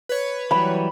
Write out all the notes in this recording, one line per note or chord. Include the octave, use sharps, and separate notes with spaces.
B4 C#5
E3 F#3 G3 B5